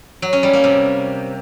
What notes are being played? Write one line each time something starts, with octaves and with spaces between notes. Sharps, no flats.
F#3
C#4
G3
A#3
C3